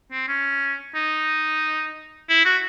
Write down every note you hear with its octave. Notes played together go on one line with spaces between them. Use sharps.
C4
C#4
D#4
E4
F#4